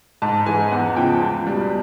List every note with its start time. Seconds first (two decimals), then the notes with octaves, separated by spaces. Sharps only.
0.22 G#2 A5
0.46 E3 G#3 G#5
0.72 E2 F#5
0.84 F#5
0.96 C#3 F3 G5
1.09 A5
1.22 C#2
1.47 B2 G3